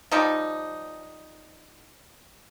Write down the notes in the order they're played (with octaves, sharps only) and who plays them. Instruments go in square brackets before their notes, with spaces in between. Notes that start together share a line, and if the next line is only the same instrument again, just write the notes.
[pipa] F3 G3 D#4